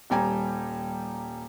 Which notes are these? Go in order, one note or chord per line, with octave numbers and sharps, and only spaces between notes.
D#1 G3 G5 G#5 A#5